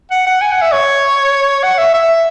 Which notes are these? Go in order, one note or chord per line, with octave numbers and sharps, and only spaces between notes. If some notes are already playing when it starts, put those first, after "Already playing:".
F#5
F#5
G#5
F#5
E5
C#5
F#5
E5
E5